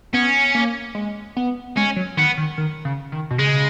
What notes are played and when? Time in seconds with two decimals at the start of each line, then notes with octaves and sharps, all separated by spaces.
0.14 B3 C#4
0.55 A#3
0.95 G#3
1.37 B3
1.77 G#3 C#4
1.96 F#3
2.17 D#3 B3
2.37 D#3
2.58 D#3
2.85 C#3
3.12 D#3
3.30 B2
3.39 C#3 G#3